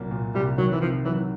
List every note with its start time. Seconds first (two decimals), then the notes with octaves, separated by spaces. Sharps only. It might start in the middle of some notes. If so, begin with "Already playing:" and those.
Already playing: C2 A#2 F#3 A#3
0.11 A#2
0.34 C2 G3
0.58 D#3 F#3
0.72 E3
0.81 C3 F3
1.05 E3 F#3